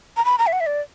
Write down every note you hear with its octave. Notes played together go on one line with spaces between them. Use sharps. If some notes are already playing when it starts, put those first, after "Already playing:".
A#5
B5
A#5
E5
F#5
E5
D5